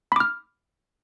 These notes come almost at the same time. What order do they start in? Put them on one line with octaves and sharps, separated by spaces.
B5 D6 F6